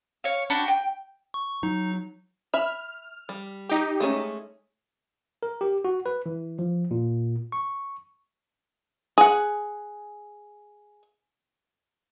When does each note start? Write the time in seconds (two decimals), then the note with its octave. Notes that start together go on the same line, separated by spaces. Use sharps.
0.24 C#5 F5
0.50 D4 F#4 G5 B5
0.68 G5
1.34 C#6
1.63 F#3 D#4
2.54 E5 B5 F6
3.29 G3
3.69 D#4 G4
4.00 G#3 A3 C#4
5.43 A#4
5.61 G4
5.85 F#4
6.06 B4
6.26 E3
6.59 F3
6.91 A#2
7.52 C#6
9.18 G#4 F#5